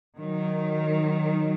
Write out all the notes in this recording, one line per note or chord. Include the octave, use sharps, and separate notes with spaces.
D#3 F#3